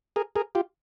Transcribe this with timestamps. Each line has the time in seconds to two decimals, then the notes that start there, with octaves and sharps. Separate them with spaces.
0.16 G#4 A#4
0.36 G#4 A#4
0.55 F4 G4